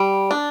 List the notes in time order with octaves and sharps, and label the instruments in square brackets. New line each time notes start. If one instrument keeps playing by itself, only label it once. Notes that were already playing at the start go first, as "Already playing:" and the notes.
Already playing: [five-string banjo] G3
D4